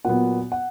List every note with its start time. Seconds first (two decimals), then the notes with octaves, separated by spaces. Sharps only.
0.05 A#2 F#3 B3 F#5
0.52 F#5